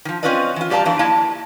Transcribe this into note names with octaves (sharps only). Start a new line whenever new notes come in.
D#3 F3
C4 C#4 F4 B4 D5 D#5
E3 F4
G2 G4 D5 F5 A5 A#5
E2 E3 F3 D4
A#3 E4 D#5 A5